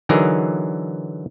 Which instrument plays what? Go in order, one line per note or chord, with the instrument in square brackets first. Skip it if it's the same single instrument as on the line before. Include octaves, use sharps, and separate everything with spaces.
[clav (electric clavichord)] D3 E3 F#3 D#4 G#4 A#4